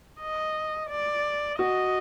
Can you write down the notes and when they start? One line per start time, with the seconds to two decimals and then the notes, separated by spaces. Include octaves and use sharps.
0.20 D#5
0.90 D5
1.59 F#4 D#5